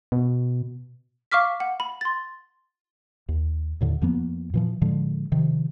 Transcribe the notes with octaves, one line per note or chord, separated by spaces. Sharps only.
B2
F5 C#6 D6 F6 B6
F#5
B5
C6 A6
D#2
D#2 A2 D3
F2 F3 A#3 B3
A#2 E3 F3
A2 D3 F3 G#3
C3 D#3 F3